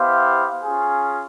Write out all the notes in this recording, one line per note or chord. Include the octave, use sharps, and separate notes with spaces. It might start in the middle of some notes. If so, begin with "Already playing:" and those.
Already playing: B3 E4 G4 C5 F5
C#4 F4 G#4